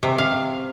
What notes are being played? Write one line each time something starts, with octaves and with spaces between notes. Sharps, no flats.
C3
F5